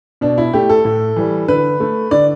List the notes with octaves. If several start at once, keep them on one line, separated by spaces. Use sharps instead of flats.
B2 D4
E4
A3 G4
A4
A2
E3 G3
D3 B4
A3
D3 D5